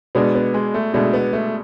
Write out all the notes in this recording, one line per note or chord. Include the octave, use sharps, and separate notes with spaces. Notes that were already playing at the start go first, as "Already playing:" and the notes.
B2 G#3 B3 D4
B3
G#3
A3
B2 G#3 A3 D4
B3
A3